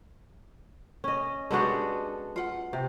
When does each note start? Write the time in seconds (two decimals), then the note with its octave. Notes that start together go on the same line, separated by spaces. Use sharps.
1.04 C#4 D#5
1.51 G#3 B3 D4 F#4 G4 A4
2.36 F4 F#5
2.73 C3